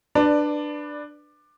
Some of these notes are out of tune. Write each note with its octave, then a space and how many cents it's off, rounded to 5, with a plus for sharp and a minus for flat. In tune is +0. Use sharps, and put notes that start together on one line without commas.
D4 +15 B4 +0 D5 +0